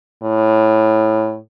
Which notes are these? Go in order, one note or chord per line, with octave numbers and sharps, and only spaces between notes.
A2